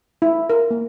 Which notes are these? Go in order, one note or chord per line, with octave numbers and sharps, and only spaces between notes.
E4
A#4
A#3